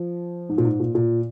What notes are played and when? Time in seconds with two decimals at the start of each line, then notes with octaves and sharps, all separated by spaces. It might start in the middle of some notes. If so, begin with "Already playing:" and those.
Already playing: F3
0.49 G#2
0.58 A#2
0.64 G#2
0.80 A#2
0.95 A#2